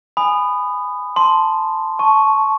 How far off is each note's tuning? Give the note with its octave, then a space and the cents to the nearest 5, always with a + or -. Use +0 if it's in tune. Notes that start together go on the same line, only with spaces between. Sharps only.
G#5 +0 B5 +15 D#6 -15
A5 +0 C6 +0
A5 -20 C#6 +0